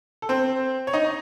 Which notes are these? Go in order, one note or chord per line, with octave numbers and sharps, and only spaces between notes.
A4
C4 C5
C#5
D#4 D#5